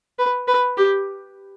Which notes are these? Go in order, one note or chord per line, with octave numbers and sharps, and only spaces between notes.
B4
B4
G4